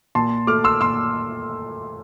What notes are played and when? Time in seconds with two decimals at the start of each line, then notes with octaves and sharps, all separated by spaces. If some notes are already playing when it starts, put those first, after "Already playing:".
0.15 A#2 A5 C6
0.47 A3 D6 F6
0.64 C6 E6
0.81 A#2 C6 E6